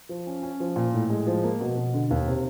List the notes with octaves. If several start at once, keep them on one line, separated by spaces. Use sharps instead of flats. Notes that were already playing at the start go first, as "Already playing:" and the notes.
F3
C#4
C#4
F3
A#2
A2
G#3
F3
A#3
B2
B2
D3
D#2
C3